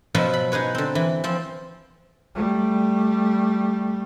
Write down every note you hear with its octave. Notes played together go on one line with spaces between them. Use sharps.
B2 F3 F#3 F4 B4 E5
B5
D#4 G#4 B4 C#5
D3 C4
E3
F3 C4
G3 A3